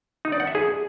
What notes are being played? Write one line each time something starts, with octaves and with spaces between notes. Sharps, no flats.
D#4
D5
F#5
E5
G#4